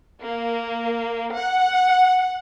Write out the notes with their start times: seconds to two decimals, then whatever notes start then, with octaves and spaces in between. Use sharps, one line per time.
0.20 A#3
1.35 F#5